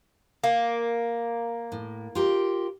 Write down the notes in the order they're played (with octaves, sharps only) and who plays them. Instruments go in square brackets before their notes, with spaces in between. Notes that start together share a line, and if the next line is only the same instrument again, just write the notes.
[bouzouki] A#3
[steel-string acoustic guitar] A2
F4 G4 A#4